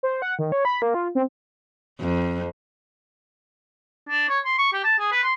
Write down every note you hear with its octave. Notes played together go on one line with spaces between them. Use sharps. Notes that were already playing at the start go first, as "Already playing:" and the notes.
C5
F#5
D#3
C#5
B5
A#3
F4
C4
F2
D4
C#5
C6
C#6
G4
A5
G#4
B4
C6